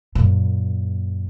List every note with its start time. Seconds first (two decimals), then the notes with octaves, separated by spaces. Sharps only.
0.15 F#2 A#2